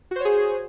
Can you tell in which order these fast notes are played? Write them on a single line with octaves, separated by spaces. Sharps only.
F#4 C5 C#5 G#4